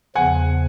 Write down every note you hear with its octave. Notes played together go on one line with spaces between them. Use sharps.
E2 C#3 F3 F#5 G#5